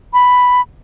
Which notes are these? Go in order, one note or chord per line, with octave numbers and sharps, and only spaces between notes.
B5